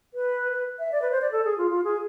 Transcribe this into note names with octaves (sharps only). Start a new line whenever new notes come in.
B4
B4
E5
D5
B4
C5
D5
A4
G#4
F4
F4
G#4